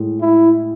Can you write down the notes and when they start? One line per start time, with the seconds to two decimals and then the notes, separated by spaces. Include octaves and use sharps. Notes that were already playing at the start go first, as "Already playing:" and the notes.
Already playing: A2 G#3
0.21 E4